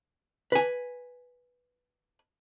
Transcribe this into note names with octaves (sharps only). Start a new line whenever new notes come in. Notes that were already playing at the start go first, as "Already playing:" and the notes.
B4 G#5